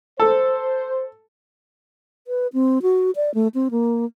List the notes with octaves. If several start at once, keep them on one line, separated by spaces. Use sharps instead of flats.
A4 C5
B4
C4
F#4
D5
A3
C4
A#3